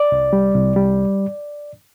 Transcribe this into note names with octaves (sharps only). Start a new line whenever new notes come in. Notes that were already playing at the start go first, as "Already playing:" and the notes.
Already playing: D5
C2
G3
C2
G3